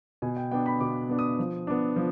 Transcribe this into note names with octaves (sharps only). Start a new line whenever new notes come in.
B2 G#5
G5
B3 D4 G5
B5
B2 D6
B3 D4
D#6
F3
B3 D4
F3